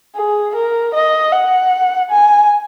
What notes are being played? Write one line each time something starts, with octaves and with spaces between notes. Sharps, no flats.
G#4
A#4
D#5
F#5
G#5